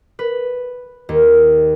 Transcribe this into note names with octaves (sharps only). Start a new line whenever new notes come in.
B4
D#2